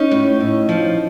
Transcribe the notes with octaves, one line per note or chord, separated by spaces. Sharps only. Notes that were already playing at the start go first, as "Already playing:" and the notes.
Already playing: C#4 D#4
A2
A2
F3